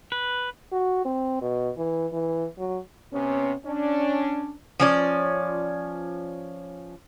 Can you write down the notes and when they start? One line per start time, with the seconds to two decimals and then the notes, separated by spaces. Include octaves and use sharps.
0.12 B4
0.72 F#4
1.05 C4
1.41 B2
1.77 E3
2.13 E3
2.58 F#3
3.13 C3 B3 C#4
3.66 C#4 D4
4.80 F3 C#4 D5